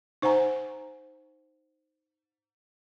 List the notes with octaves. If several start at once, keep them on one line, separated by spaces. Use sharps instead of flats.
D#4 C5 F#5 G#5 A#5